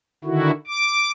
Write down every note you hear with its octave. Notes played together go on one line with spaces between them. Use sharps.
D3 D#3 E4 F#4
D6